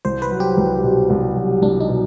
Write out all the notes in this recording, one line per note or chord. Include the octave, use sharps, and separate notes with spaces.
C2 C5
B4
F#3
G4
C2
B2
C2
F#3
C2 D4
D#4
B2